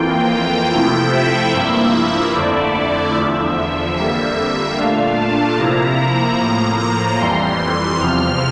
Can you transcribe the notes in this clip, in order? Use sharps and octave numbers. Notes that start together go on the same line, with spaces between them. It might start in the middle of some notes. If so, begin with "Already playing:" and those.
Already playing: F2 E3 A#3 F4 G5
G5
C3 F3 A3 E4
E5
G2 F3 A#3 E4
F2 D3 A3 E4 D5
E2 D3 F3 E5
F2 D3 G3 A#3 E5
A#2 A3 D4 F4 F5
A5
C3 F3 A#3 E4 A#5
A2 F3 A#3
A#5
F2 E3 G3 C6
E2 C3 F3 F6